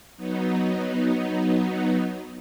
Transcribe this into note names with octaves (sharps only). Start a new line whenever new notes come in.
F#3 B3 D#4